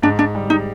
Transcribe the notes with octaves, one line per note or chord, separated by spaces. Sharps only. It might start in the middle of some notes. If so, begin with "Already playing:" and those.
G#2 D4
D4
G3
D#4